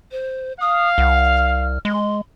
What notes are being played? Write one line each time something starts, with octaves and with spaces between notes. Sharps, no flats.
C5
F5 D#6
C2 F#5
F6
G#3 C6